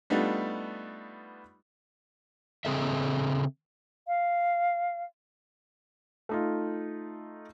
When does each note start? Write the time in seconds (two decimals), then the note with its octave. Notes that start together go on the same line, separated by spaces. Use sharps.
0.10 G3 A3 B3 D4 D#4 F4
2.65 C#3 C4 G#4 A4 D#5 E5
4.08 F5
6.29 A3 D#4 F4